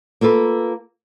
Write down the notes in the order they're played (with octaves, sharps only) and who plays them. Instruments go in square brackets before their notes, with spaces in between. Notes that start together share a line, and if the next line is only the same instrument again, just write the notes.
[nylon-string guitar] A#3 F4 A4 B4